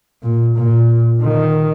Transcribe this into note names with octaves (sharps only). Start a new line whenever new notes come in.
A#2
A#2
D#3